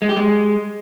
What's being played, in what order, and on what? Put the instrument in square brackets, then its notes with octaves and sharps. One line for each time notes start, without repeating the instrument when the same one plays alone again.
[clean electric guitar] G#3
G4
G#3